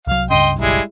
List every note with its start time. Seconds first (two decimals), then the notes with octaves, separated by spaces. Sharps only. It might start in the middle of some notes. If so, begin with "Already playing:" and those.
0.07 C2 F#3 F5
0.30 C#2 G2 C#3 D#5 G5 C6
0.59 F#1 B1 G3 G#3 E4